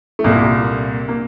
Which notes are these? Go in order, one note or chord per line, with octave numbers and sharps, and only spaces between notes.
A3
C2 A#2 A#3
A#3